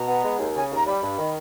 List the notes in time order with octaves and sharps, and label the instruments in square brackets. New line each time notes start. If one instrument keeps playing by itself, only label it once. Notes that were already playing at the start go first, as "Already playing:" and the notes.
Already playing: [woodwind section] B2 [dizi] A#5
[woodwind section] B3
G#3
D#2
[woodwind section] C#3 [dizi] G#5
[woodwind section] D#2 [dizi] A#5
[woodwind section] G3 [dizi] B5
[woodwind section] G2
D#3